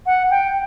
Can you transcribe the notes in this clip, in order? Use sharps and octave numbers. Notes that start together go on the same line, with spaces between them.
F#5
G5